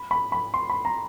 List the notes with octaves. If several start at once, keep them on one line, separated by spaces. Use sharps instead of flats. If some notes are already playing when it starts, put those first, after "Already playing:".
Already playing: B5
B5
B5
C6
B5
A#5